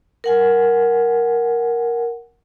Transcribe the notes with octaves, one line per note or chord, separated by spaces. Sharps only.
A#4 F#5 G#5